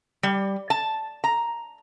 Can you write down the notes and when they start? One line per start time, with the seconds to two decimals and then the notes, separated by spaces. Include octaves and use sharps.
0.23 G3
0.70 A5
1.24 A#5